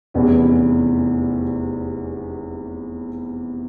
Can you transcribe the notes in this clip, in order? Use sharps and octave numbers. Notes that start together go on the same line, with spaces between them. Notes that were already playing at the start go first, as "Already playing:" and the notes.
F1 E2 C3 E3 B3 C#4